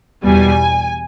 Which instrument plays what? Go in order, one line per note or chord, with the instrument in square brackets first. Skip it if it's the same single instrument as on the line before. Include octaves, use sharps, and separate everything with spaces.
[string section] E2 B2 G3 G#5